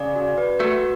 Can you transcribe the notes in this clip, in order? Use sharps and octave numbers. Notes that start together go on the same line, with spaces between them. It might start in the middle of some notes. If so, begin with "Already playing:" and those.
Already playing: C#3 D5
F#4
B4
A3 F#4